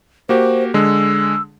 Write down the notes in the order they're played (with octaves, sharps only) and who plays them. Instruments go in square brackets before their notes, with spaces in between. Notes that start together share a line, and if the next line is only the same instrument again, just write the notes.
[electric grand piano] A#3 F#4 G4 [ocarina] C5
[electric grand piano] D3 G#3 [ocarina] E6